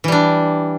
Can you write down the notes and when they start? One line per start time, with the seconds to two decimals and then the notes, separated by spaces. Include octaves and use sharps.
0.04 E3
0.08 G3
0.12 D4